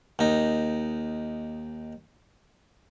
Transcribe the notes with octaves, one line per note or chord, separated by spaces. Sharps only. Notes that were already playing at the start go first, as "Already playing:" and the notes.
D#2 D#4